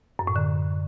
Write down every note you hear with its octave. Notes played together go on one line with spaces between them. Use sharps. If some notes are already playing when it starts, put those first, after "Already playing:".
F#2
A2
D3